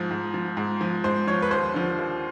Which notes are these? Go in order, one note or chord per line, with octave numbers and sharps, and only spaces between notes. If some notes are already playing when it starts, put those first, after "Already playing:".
Already playing: G#2 F3
G#2
F3
G#2
F3
G#2 C5
F3 C#5
B4
D#2 C5
D3 F3
D#2